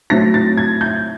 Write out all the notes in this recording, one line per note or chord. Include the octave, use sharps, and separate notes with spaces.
A2 F#3 A3 C4 E4 A#6
A6
G#6
G6